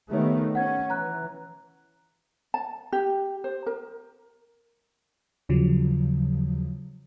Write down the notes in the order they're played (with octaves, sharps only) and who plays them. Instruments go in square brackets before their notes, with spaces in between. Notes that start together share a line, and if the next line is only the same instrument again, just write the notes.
[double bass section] D#3 A3 B3 [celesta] G4 C#5
[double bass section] C#4 [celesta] F#5 G#6
[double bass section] E3 [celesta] A#5 F#6
[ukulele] A5
G4
C5
A#4
[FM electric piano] D#2 C#3 F3 F#3